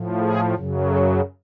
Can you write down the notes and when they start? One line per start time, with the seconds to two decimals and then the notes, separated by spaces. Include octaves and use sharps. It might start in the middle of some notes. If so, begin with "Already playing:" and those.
Already playing: A2 F3
0.20 G#4
0.54 F#2 C#3 F#3
0.88 A4